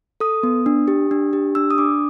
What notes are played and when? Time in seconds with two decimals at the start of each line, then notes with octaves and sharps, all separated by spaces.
0.20 A4 D#6
0.43 B3
0.66 D4
0.88 G4
1.11 D4
1.33 G4
1.55 D4 E6
1.71 D#6
1.78 D4 D6